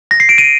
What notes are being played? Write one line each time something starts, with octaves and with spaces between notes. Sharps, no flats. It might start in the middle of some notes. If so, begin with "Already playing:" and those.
A#6
C7
D7
D#7